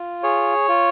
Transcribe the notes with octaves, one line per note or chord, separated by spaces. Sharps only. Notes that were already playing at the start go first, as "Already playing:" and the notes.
Already playing: F4
G#4 C#5
F4